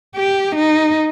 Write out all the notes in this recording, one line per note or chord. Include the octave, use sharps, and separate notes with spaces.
G4
D#4